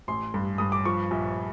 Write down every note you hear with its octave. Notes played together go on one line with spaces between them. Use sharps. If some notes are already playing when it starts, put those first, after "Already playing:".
A1 C6
G2
G2 D#6
D6
F3 C#6
A#1